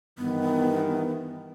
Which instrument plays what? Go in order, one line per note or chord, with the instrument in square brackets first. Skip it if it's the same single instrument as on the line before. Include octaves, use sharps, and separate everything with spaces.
[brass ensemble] G2 D#3 E3 [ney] B3